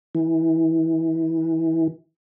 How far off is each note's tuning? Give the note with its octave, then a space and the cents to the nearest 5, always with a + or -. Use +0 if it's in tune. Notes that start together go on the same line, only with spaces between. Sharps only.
E3 -25